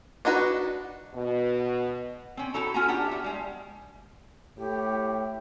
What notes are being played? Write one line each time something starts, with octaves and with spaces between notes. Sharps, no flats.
D4 D#4 F#4 B4
B2
C4 C#4
D#4 E4 F#4 A4 A#5
C#4 F4 F#4 F#5 G#5 A#5
B3 D4 G4 F#5 G5
F#4 E5
G3 G#3
A2 G4